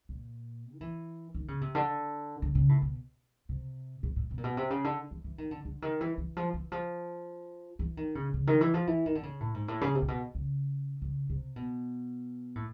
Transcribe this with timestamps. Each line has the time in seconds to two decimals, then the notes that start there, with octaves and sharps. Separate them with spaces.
0.09 A#2
0.75 F3
0.81 E3
1.34 D#3
1.48 C#3
1.61 C3
1.75 D3
2.42 D3
2.55 C#3
2.69 A2
2.82 B2
3.49 C3
4.03 B2
4.16 A2
4.31 B2
4.38 A#2
4.44 B2
4.57 C3
4.70 C#3
4.84 D3
5.11 E3
5.24 E3
5.38 D#3
5.51 D3
5.65 D3
5.82 D#3
6.01 E3
6.18 E3
6.37 F3
6.54 E3
6.72 F3
7.79 E3
7.97 D#3
8.15 C#3
8.34 C#3
8.47 D#3
8.61 E3
8.74 F3
8.87 E3
9.06 D#3
9.15 D3
9.23 C#3
9.40 A2
9.54 G#2
9.68 A2
9.81 C#3
9.95 C3
10.02 A#2
10.08 B2
10.35 C#3
11.02 C#3
11.30 C3
11.56 B2
12.56 A2